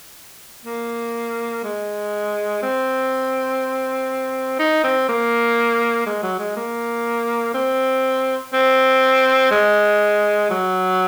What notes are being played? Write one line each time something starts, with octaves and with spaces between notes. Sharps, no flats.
A#3
G#3
C4
D#4
C4
A#3
G#3
F#3
G#3
A#3
C4
C4
G#3
F#3